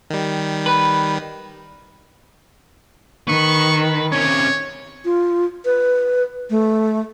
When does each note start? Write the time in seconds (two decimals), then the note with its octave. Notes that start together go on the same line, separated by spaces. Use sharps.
0.10 D#3 G3
0.66 B4
3.28 D#3 B4 C#6
4.12 C3 C#4 C#5
5.05 F4
5.65 B4
6.50 A3